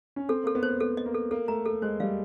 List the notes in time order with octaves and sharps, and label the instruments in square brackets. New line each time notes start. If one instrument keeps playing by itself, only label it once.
[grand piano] C#4
[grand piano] C4 [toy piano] A4
[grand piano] A#3 [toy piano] A4
[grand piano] B3
[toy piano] C5
[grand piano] B3 [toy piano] A4
[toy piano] D#5
[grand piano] A#3
[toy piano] A4
[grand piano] A#3 [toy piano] A4
[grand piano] A3 [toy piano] A#5
[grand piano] A3 [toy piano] A4
[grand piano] G#3 [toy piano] C5
[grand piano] G3 [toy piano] F5